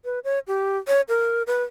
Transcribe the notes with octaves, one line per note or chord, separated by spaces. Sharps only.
B4
C#5
G4
C#5
A#4
B4